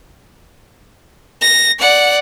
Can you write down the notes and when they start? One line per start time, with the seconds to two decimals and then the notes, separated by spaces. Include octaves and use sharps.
1.41 A#6
1.79 D5 F#5